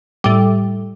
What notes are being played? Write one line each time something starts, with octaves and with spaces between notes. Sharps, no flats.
A2 G3